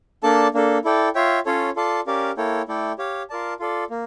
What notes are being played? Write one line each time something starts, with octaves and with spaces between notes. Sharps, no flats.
A#3 D4 A4 D5 A5
A#3 D4 A4
E4 A4 D5 G5
F4 C#5 E5 G5
C#4 F4 A4 C#5
F4 A4 D5 A5
C#4 G4 A#4 D5 F5
A#3 E4 A4 C#5 G5
A3 E4 A4 D5 G5
G4 C#5 F5
F4 A#4 D5 A5
F4 A4 D5
A#3